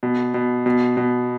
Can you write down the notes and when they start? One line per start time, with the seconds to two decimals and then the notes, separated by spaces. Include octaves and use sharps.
0.03 B2
0.34 B2
0.66 B2
0.97 B2